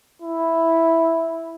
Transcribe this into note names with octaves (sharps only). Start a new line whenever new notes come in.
E4